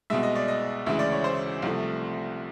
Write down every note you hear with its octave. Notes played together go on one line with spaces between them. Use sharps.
C2 B2 G#3 E5
D#5
D5
D#5
D2 C#3 E3 G#3 E5
D5
C#5
C5
C2 C3 F3 A3